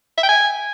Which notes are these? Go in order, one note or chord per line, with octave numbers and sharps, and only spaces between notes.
E5
G5
G#5